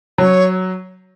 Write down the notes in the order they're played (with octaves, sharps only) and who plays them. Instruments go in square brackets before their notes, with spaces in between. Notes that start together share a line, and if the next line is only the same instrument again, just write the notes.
[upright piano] F#3 [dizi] C#5